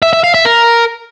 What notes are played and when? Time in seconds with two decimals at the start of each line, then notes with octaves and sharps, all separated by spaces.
0.02 E5
0.13 E5
0.24 F5
0.34 E5
0.45 A#4